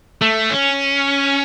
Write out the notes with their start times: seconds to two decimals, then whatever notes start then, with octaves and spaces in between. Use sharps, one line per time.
0.22 A3
0.50 C#4